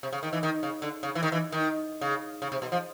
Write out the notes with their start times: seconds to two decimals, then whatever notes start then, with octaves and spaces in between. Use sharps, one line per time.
0.03 C3
0.13 C#3
0.23 D#3
0.33 E3
0.43 D#3
0.63 C#3
0.82 D3
1.03 C#3
1.15 E3
1.23 D#3
1.32 E3
1.52 D#3
2.01 C#3
2.42 C#3
2.52 C3
2.62 B2
2.72 F3